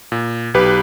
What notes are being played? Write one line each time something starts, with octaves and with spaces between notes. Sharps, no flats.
A#2
B1 G4 B4